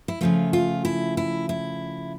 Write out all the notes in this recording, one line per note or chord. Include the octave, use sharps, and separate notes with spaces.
E4
C#3 F3 A3 F4
F4
E4
E4
E4